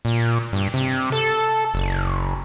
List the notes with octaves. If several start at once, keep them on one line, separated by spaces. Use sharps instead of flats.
A#2
G2
C3
A4
F#1